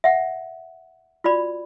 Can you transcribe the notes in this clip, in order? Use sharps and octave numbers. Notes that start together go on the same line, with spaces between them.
E5 F#5
F4 F#4 D5 B5